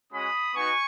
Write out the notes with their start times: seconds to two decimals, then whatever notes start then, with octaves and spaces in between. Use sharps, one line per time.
0.12 G#3 C#4 F#4 B5 D#6
0.55 B3 D#4 F#4 G#5 C#6